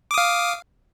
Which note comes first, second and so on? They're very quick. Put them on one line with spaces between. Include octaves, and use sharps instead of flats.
D6 D#6 F5